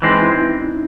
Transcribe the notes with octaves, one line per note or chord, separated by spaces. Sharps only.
E3 G#3 C4 D#4
E4
D#4
E4
D#4